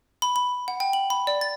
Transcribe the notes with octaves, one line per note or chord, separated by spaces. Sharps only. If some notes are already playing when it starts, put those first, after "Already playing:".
B5
B5
F#5
G5
F#7
B5
D5
A6